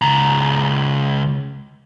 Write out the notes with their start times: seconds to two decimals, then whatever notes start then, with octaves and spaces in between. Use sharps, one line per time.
0.02 C#2 A#5